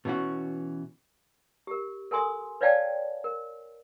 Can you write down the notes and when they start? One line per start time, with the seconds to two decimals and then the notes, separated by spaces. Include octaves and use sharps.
0.05 B2 E3 C#4 F#4
1.67 G4 A#4
2.11 A4 A#4 G#5 C6 D#6
2.61 B4 C#5 D5 F5 G5 A5
3.24 A#4